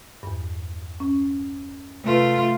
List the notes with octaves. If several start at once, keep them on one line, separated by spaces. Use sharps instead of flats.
E2 G2
C#4
C3 A3 F4 B4